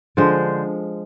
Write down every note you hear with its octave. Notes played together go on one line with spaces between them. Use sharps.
D3 F3 G#3 C5